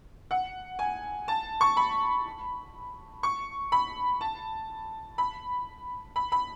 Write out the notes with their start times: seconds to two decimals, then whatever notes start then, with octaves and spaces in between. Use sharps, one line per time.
0.31 F#5
0.79 G#5
1.28 A5
1.61 C#6
1.77 B5
3.23 C#6
3.72 B5
4.21 A5
5.18 B5
6.16 B5
6.32 B5